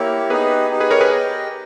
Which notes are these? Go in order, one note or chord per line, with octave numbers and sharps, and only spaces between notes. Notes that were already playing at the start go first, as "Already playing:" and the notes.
Already playing: A#3 E4 G4 A#4 C#5
B3 D#4 G4 G#4 B4
B3 D#4 G4
G#4 B4
A#4 C#5
G#4 B4
G4 A#4 D#5 G5